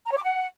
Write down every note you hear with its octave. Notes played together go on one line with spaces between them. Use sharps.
A#5
C#5
D6
F#5